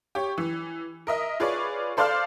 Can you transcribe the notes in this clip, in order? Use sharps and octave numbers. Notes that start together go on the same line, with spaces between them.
G4 C#5
E3
A#4 D#5 E5
F4 G#4 B4 C#5 D5
A4 C5 D5 F5 C6 F6